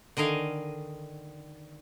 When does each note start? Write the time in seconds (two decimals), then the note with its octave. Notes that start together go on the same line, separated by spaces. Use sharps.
0.17 D3 D#3 D#5 F5 G#5